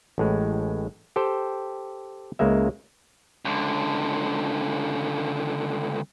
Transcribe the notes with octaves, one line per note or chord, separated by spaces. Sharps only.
A1 A2 G#3
G4 A4 C5 G5
C#2 C#3 G#3 A#3 E5
C#2 D3